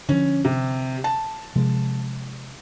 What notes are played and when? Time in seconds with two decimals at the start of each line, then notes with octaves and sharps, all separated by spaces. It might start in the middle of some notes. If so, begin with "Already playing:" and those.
0.09 D3 F3 C#4
0.45 C3
1.04 A5
1.56 C3 F3 G#3